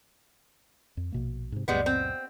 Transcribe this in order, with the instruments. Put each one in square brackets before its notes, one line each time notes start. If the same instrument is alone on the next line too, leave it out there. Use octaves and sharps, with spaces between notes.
[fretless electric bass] F2
A#1 B2 A#3
G#2 C3
[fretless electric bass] C#2 F#2 A#2 [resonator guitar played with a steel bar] G3 G#3 B3
[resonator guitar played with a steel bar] C4